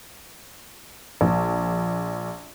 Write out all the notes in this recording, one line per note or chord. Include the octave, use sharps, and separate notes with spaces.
A#1